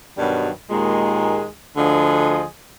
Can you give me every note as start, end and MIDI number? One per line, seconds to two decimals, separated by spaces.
0.18 0.49 43
0.18 0.49 47
0.18 0.49 51
0.18 0.49 54
0.18 0.49 55
0.70 1.47 39
0.70 1.47 46
0.70 1.47 56
1.76 2.43 38
1.76 2.43 50
1.76 2.43 53
1.76 2.43 68
1.76 2.43 75